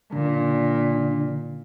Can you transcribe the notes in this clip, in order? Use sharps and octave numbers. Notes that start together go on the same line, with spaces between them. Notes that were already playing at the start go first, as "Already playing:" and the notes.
A#2 D3